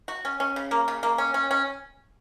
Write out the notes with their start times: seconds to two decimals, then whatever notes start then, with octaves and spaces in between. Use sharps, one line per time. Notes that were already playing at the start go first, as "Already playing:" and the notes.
0.08 F#4
0.25 C#4
0.40 C#4
0.56 C#3
0.71 A#3
0.88 C#3
1.03 A#3
1.18 C#4
1.34 C#4
1.51 C#4